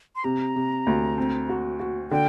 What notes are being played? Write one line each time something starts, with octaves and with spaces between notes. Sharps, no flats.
C6
C3 A#5
C3
D2
C4
F#4
F#4
D3 G5